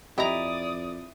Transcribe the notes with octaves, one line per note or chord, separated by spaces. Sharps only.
F2 E4 G4 D5 D#5 A#5 D#6